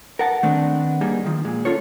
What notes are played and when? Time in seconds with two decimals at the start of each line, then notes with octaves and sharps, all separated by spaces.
0.19 A#4 F#5 A5
0.43 D#3 A3 B3 C4 D4
1.01 G3 A#3 D#4 G#4
1.24 D#3 F3
1.45 A#2 G#3
1.65 C#4 F4 A4 C#5